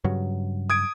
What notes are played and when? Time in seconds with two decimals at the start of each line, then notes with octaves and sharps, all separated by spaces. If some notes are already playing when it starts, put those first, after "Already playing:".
0.04 G2 C#3 F#3
0.70 D#6 G#6 D7